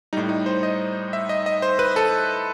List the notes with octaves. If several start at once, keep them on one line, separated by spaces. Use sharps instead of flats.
A2 G3 D#4
D#4
C5
D#5
E5
D#5
D#5
C5
B4
A4